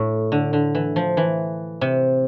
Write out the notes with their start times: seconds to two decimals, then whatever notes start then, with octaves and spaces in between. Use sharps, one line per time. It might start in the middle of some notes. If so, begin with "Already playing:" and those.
Already playing: A2
0.32 D3
0.53 D3
0.75 E3
0.96 F3
1.17 E3
1.81 C3